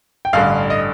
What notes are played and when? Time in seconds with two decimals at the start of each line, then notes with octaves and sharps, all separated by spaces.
0.25 G5
0.33 A1 G2 D3 F5
0.70 D#5